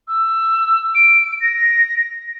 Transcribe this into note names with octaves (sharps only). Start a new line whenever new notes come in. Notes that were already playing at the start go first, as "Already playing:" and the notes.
E6
D7
A#6